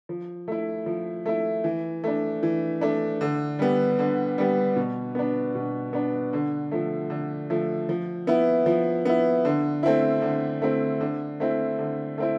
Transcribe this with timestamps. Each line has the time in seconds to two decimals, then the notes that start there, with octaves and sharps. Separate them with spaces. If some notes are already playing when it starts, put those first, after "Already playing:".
0.09 F3
0.48 A3 E4
0.86 F3
1.26 A3 E4
1.64 E3
2.04 A3 D4
2.43 E3
2.81 A3 D4
3.21 D3
3.59 G3 B3
3.99 D3
4.38 G3 B3
4.76 B2
5.15 B3 D4
5.55 B2
5.93 B3 D4
6.33 D3
6.71 F3 A3
7.10 D3
7.50 F3 A3
7.89 F3
8.27 B3 E4
8.66 F3
9.05 B3 E4
9.45 D3
9.83 A3 C4 E4
10.22 D3
10.62 A3 C4 E4
11.01 D3
11.40 A3 C4 E4
11.79 D3
12.18 A3 C4 E4